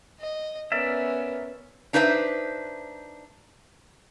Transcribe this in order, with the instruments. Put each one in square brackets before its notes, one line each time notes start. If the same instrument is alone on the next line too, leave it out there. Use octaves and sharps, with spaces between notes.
[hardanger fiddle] D#5
[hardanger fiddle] B3 C#4 [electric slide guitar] A#4 D5 E5
[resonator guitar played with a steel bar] D4 D#4 B4 C5 D5 E5